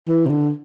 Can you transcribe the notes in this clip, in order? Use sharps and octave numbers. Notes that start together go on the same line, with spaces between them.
E3
C3
D3